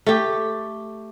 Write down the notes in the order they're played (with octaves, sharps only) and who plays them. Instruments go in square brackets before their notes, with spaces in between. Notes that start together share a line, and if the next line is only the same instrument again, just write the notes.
[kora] A3 G4